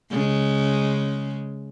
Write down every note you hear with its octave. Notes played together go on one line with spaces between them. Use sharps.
C#3 G#3